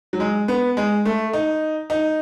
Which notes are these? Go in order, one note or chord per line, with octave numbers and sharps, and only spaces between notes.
F#3
G#3
B3
G#3
A3
D#4
D#4